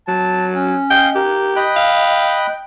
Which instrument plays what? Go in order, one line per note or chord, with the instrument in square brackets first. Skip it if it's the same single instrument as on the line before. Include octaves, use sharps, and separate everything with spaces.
[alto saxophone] F#3 [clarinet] A5
[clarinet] C#4
[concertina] D#5 F5 [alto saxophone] G5
[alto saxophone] G4 [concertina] A#4
[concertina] D#5 B5 F#6 [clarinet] G5
[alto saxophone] F5